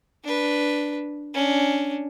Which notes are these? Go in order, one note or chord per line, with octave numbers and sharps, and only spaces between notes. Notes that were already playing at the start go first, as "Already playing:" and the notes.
D4 B4
C#4 D4